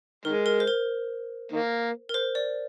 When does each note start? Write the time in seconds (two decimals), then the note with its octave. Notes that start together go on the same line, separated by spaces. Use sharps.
0.25 D#3 G#3 A#4
0.46 A#4
0.60 C5
0.68 A#4
1.52 D#3 A#3
2.09 A#4
2.14 C5
2.35 D5